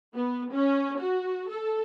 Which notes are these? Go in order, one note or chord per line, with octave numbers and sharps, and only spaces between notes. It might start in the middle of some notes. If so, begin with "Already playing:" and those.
B3
C#4
F#4
A4